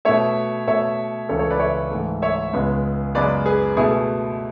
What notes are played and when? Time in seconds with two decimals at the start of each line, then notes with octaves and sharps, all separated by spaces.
0.05 B2 A3 C#5 E5
0.67 B2 A3 C#5 E5
1.29 C#2 C#3 E3 A4 C#5
1.39 A4 C#5
1.50 B4 D5
1.60 C#5 E5
1.91 G#2 E3 A3
2.22 C#5 E5
2.53 C#2 C#3 G#3 B3
3.15 F#2 C#3 G#3 B3 B4 D5
3.46 G#4 B4
3.77 B2 A3 E4 G#4